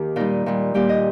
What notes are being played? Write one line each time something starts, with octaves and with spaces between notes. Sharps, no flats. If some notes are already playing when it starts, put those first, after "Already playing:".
Already playing: D#2 D#3 G4 A#4
A#2 G3 D#4
A#2 G3
A#2 G3 G4
D#5